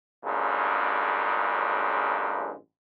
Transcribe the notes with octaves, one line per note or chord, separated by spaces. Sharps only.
A1 G2 A#2 C#3 F#3 G#3